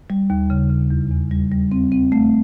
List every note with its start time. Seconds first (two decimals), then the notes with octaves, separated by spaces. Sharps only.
0.10 G3
0.30 D#2
0.50 C#3
0.70 C#3
0.91 E2
1.11 E2
1.31 G3
1.52 G3
1.72 C4
1.92 C4
2.12 A3